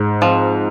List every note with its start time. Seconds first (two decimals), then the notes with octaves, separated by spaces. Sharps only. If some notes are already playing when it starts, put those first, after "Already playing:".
Already playing: G#2
0.22 F3 C4